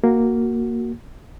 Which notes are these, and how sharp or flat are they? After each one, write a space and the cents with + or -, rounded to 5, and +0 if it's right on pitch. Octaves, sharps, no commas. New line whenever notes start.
A#3 -5 F#4 +0